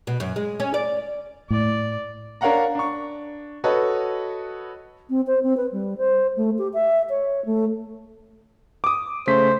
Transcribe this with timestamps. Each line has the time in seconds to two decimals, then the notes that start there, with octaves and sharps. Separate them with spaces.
0.07 B2
0.20 F#2
0.36 G#3
0.60 C#4
0.74 D5
1.50 A2 D5
2.41 D4 A#4 C#5 F5 F#5 A#5
2.75 D4 C#6
3.64 F#4 A4 B4 C#5 D#5
5.09 C4
5.26 C5
5.43 C4
5.56 B4
5.72 G3
5.97 C5
6.36 A3
6.58 G4
6.73 E5
7.09 C#5
7.45 A3
8.84 D6 D#6
9.27 C#3 A3 C5 B6